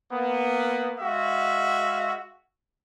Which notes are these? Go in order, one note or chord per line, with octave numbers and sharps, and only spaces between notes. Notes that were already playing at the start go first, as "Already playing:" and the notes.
A#3 B3
G#3 F#4 E5 F5